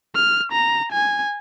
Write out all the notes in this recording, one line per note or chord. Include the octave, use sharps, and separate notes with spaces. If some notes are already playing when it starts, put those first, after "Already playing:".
F6
A#5
G#5